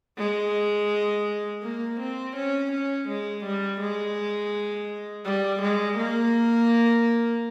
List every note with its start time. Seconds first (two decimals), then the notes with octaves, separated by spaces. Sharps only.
0.18 G#3
1.63 A#3
2.00 C4
2.36 C#4
2.72 C#4
3.09 G#3
3.44 G3
3.81 G#3
5.26 G3
5.62 G#3
5.98 A#3